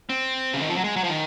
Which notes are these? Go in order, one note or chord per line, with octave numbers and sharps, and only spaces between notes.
C4
C#3
D#3
F3
F#3
G#3
F#3
F3
D#3